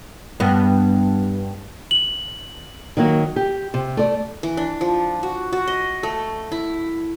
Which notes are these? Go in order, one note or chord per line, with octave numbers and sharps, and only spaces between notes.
G2 B3
F#7
D#3 F#3 A#3 F#4
G4
C3
A3 D5
E3
D4
F3
F#4
F#4
D#5
A3
E4